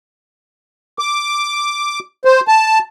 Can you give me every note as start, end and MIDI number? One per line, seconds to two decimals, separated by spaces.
0.99 1.99 86
2.25 2.40 72
2.48 2.79 81